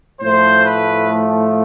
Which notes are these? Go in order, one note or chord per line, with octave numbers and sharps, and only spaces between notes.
A2 F3 A3 C5
B4